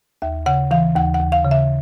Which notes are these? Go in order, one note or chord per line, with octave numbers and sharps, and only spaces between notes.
D#2 E5
C#3 F#5
E3 F5
D#2 F#5
F#5
D#2
F5
C#3
E5